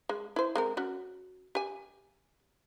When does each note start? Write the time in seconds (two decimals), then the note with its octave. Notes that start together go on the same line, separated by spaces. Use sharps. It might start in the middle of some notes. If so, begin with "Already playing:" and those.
0.09 G#3
0.36 E4 C5
0.55 G#3 C4 A#4
0.77 C#4 F#4
1.55 G4 G#5